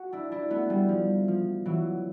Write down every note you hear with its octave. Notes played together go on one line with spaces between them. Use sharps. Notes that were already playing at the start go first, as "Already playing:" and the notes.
Already playing: F#4
D4 E4
D4 E4
A3 B3
G3 A3
F3
F3
E3 F#3